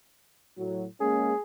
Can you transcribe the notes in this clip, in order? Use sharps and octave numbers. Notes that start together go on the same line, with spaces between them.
A2 F#3
G#3 A#3 C#4 G#4